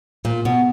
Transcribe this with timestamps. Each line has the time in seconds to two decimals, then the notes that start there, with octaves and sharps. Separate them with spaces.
0.25 A#2
0.45 B2